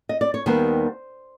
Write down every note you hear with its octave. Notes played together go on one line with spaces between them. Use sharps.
D#5
D5
C#5
D#2 D#3 G3 B3 C5